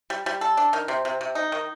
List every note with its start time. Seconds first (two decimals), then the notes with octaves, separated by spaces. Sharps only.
0.10 G3
0.26 G3
0.41 A4
0.57 D4
0.73 D#3
0.88 C3
1.05 C3
1.21 C3
1.35 D#4
1.52 D#3